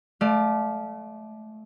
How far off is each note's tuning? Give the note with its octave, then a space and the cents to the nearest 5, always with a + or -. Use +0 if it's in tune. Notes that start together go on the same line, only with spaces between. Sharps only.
A3 -25 D5 +15 F5 +0